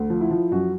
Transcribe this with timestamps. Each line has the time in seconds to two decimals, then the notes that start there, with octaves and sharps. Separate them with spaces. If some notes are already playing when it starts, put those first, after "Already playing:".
Already playing: D2
0.10 F3
0.21 E4
0.31 F3
0.51 F#2 F#4